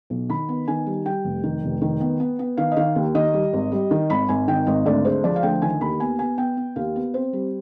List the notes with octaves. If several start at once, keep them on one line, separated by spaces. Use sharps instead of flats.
B1
D#3 B5
B3
D#3 G#5
G3
G3 G5
F1
D#3
F1
D#3
B3
B3
B3
D#3 F5
D#5
D#3 F5
D#2
D#3 D#5
G3
G#1
G3
D#3
G#1 B5
G#1 G#5
D#3 G5
G#1 D#5
D2 D5
G#3 C5
F3 D5
F5
D2 G5
D#3 G#5
D#2 B5
B3 G#5
B3 G#5
B3 G5
B3
D#2 F5
B3
C4 C5
G3